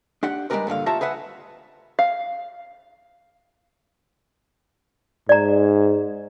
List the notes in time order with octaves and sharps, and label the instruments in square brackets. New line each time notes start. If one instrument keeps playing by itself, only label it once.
[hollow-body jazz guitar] D4 G4 F#5
G3 G#3 C4 G4 A#4 B4
G2 A#2 D3 F5
F4 G4 C#5 E5 A5 A#5
G#4 B4 E5 F#5
[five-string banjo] F5
[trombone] G#2 [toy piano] D5 A#5